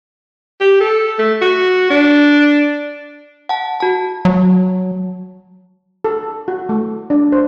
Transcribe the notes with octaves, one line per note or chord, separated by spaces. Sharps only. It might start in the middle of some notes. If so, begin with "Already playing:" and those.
G4
A4
A3
F#4
D4
F#5 A5
F#4 A5
F#3
A4
F#4
A3
D4
C5